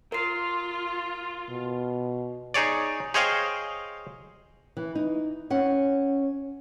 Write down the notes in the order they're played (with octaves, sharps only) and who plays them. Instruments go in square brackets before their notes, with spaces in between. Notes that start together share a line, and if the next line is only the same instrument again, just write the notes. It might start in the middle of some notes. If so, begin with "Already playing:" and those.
[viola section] F4 [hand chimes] A#4 C7
[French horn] B2
[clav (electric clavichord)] D#4 G#4 C#5 D5
G#4 C5 C#5 D#5 F5 G5
[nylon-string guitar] E3
D#4
C#4 F#5